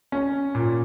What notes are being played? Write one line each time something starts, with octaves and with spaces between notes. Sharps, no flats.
C#4
A#2